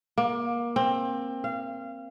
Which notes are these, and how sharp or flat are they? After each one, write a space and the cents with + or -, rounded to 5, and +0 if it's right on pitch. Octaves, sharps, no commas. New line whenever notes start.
A#3 +25
C4 +20
F5 -25